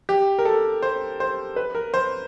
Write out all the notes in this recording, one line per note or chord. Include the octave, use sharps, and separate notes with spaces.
G4
A#4
A4
C5
C5
B4
A#4
C5